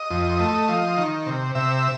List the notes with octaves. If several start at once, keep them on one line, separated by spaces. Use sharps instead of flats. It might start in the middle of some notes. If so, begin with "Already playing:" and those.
Already playing: D#5
F2
A3
F3
D#3
C3
C3 E5